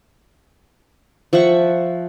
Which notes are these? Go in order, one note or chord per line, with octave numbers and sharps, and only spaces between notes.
F3 E5 F#5 C#6